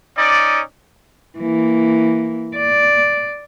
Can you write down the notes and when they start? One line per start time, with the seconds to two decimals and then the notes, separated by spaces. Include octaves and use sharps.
0.17 C#4 D#4 D5
1.38 E3 A#3
2.56 D5